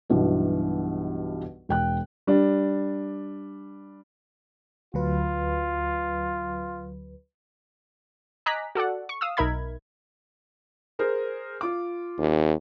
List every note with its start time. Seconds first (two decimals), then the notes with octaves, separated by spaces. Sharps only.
0.10 B1 G2 B2 E3 B3
1.69 E1 G5 F#6
2.27 G3 D4
4.94 D2 F#3 F4 B4
8.46 D#5 G#5 A#5 D6 F#6 B6
8.75 F#4 A4 D5 F#5
9.09 C#6
9.21 F5 D#6 E6
9.37 B1 D#4 A#4 E5 B5 G#6
10.99 G#4 A#4 C5
11.61 F4 D6
12.18 D#2